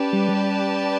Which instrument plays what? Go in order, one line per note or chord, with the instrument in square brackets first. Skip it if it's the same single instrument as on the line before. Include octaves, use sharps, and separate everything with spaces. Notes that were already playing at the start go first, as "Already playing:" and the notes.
Already playing: [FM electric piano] C#4 [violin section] G4 B4 D5 A5
[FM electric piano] G3
G3